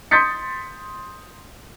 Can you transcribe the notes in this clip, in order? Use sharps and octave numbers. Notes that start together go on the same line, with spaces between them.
C6 D#6 G6 A6 B6 C#7